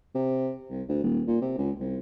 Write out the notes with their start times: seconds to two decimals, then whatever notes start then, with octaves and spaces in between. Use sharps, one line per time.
0.15 C3
0.70 C2
0.88 D2
1.03 D#1
1.27 A#2
1.41 C3
1.57 C#2
1.80 C2